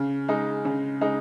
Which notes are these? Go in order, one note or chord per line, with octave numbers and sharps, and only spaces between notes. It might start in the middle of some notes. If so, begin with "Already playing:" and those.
Already playing: C#3
G#3 D#4
C#3
G#3 D#4